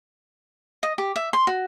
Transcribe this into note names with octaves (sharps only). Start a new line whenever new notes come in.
D#5
G4
E5
C6
F#4